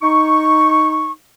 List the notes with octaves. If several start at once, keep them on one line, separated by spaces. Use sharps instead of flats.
D#4 C#6